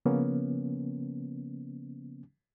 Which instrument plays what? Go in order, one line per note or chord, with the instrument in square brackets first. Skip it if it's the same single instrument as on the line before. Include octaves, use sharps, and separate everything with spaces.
[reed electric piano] C#3 F3 A#3 B3 C#4